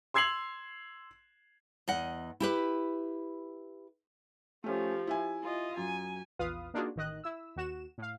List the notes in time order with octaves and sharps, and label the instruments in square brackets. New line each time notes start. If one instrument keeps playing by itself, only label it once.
[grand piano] C6 E6 G#6 C7 F7 F#7
[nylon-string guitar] E2 D#5 F#5
E4 G4 B4
[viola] F3 G4 [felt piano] A3 C#4
[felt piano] E4 E5 G#5
[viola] F4 D#5
[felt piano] F#2 [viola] G#5
[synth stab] A#1 E2 F4 B4 F5 D#6
A#3 D4 D#4 F4 F#4 G#4
A1 D#3 D#5 F#6
E4 E6
D#2 F#4 E7
A2 F5